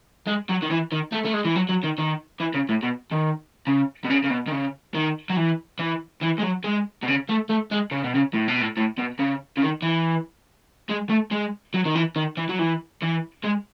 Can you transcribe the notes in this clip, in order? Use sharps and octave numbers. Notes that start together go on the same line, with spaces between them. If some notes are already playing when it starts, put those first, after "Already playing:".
G#3
F#3
D#3
E3
D#3
A3
A3
G#3
E3
F#3
F#3
D#3
D#3
E3
C#3
A2
B2
D#3
C#3
B2
C#3
C#3
B2
D#3
C#3
D#3
F#3
E3
E3
E3
G#3
F#3
G#3
B2
C#3
A3
A3
G#3
C#3
B2
C#3
A2
B2
A2
A2
B2
C#3
C#3
D#3
E3
G#3
A3
G#3
F#3
D#3
E3
D#3
E3
F#3
E3
E3
G#3